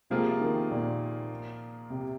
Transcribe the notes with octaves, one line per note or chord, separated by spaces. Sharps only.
C3 F3 A#3 F4 G#4
D#3
A#2
C3